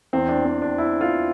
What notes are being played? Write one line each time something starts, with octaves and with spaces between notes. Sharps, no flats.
E2 E3 C4
D4
C4
D4
E4
F4